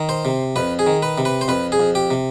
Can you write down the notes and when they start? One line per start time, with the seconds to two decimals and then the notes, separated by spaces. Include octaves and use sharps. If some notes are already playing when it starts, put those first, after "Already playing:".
Already playing: D#3
0.09 C5
0.25 C3
0.56 F2 B4
0.79 G#4
0.86 D#3
1.03 B4
1.18 C3
1.25 B4
1.41 C5
1.48 F2 B4
1.72 G#4
1.80 F2
1.95 G4
2.10 C3